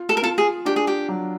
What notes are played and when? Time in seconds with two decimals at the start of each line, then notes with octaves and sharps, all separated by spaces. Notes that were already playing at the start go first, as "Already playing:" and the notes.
Already playing: F4
0.09 A4
0.17 A#4
0.23 F4 A4
0.38 G#4
0.65 D4 G4
0.76 G#4
0.87 G4
1.08 F#3